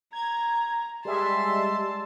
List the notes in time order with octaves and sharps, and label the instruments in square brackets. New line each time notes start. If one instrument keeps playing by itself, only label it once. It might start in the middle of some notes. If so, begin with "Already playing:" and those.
[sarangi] A#5 [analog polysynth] G#6
[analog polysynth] G3 G#3 E5 [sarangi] A5 [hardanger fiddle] C6